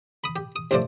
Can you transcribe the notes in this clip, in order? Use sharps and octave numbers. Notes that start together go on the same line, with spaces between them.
B5 D#6
G4
D#6
C2 G2 F3 A3 C5 D5